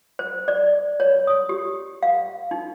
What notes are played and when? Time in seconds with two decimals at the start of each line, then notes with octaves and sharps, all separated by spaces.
0.19 C5
0.48 D5
1.00 C#5
1.27 D#6
1.49 G4
2.03 F5
2.51 D#4